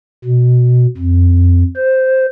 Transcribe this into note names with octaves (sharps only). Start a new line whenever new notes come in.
B2
F2
C5